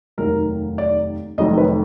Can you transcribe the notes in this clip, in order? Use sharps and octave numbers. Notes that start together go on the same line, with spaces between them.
F1 D#2 D#3 F#3 A#4
D5
F1 F2 D#3 F#3 D#5
B4